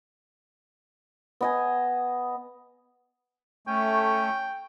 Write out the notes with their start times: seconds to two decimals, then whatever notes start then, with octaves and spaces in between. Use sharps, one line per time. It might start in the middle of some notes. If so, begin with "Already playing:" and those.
1.41 B3 D#5 G#5
3.67 A3 C#4 G5